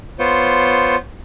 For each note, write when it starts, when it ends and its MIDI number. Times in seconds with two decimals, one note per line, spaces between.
0.19 0.96 59
0.19 0.96 65
0.19 0.96 72
0.19 0.96 73